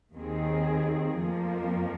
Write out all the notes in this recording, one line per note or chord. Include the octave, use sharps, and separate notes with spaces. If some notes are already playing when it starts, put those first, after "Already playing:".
D#2 D#3 C4 G#4
F2 F3 A#3